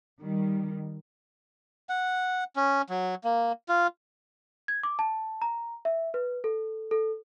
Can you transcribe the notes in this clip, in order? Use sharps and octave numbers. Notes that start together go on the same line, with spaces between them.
D#3 G3
F#5
C#4
F#3
A#3
F4
G#6
D6
A5
A#5
E5
B4
A4
A4